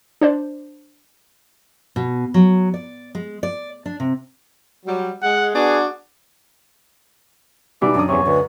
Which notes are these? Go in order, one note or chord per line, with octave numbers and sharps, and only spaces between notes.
D4 C5 D5
B2
F#3
D5
G#3
D5
D4
C3
F#3 G3
G#3 F#5
B3 D4 F#4 G#4
B2 E3 G3 D#4 D5
F#2 D4 D#6
E2 C3 C#4 C#5
D2 B4